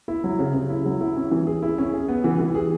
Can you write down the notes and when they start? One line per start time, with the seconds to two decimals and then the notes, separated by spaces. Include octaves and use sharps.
0.08 E4
0.24 F#3
0.39 C#3
0.54 C#3
0.70 E4
0.85 F#3
1.01 E4
1.16 C#4
1.31 E3
1.47 G#4
1.63 E4
1.78 C#4
1.93 G#4
2.08 B3
2.24 E3
2.39 E3
2.55 G#4